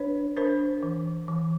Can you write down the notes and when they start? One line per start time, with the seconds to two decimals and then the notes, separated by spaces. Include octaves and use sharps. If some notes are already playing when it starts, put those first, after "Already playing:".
Already playing: D4 B4 C#5
0.37 D4 A#4 C5
0.83 E3
1.28 E3